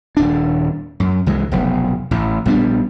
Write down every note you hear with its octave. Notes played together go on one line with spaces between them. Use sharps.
D#1 D4
F#2
C2 E3 G#3
F1 B1
A1 A2
A#1 G3 B3 D4